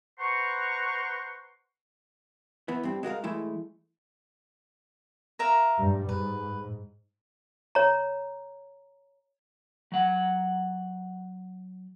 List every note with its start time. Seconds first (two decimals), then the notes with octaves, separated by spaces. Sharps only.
0.19 B4 C5 F#5 A#5 C6 C#6
2.68 E3 B3
2.83 G2 C4
3.03 G#3 F#4 A#4 F5
3.24 E3 G#3 A3 E4
5.39 A#4 E5 F5
5.78 G2 G3
6.09 G#2 B4
7.75 C#5 A#5
9.92 F#3 F#5